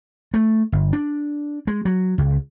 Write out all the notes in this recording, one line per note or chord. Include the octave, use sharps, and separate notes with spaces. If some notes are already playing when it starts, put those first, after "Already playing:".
A3
G1
D4
G#3
F#3
C#2